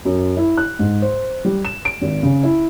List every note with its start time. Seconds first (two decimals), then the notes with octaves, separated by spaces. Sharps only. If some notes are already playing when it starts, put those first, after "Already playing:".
0.05 F#2
0.37 E4
0.58 F#6
0.79 G#2
1.02 C5
1.45 G3
1.65 E7
1.85 D7
2.02 G#1
2.23 C#3
2.43 E4